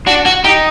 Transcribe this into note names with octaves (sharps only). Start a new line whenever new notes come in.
D4 F#4
F#4
D#4 G4